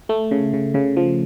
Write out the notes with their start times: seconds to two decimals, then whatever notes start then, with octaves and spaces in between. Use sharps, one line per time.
0.09 A3
0.31 C#3
0.53 C#3
0.74 C#3
0.97 F3